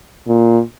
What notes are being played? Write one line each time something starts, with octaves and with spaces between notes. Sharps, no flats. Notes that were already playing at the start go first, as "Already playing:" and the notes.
A#2